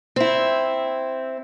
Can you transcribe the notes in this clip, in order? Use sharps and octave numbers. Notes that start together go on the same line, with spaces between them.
C4 E4